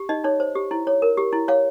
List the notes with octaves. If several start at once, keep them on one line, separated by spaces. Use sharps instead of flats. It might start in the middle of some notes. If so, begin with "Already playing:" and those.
Already playing: G4
D#4 D#5
D#4 C#5
C5
G4
E4
C#5
A#4
G4
E4
C#5 F5